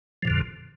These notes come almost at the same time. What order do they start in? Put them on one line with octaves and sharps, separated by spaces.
F3 A#2 D3 F2